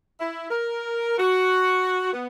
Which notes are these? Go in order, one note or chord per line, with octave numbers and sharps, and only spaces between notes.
E4
A#4
F#4
B3